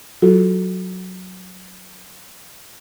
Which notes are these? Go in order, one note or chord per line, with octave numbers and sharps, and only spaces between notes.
F#3 F4 F#4 A4